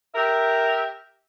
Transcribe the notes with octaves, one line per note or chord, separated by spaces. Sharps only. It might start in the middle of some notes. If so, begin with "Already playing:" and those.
G4 A#4 E5